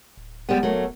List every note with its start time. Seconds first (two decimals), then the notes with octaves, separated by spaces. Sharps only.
0.17 D1
0.49 G3 G#3 B3
0.63 F#3 A3 A#3